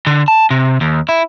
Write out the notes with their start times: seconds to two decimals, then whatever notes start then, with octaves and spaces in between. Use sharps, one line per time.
0.07 D3
0.28 A5
0.50 C3
0.81 D#2
1.09 E4